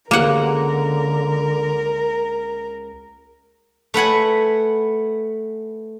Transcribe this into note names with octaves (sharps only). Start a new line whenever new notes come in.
C#2 D3 A#3 A#4 F#5
A3 B4 F#5 G#5